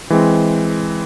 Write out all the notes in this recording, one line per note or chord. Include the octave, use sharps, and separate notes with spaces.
E3 G#3 C4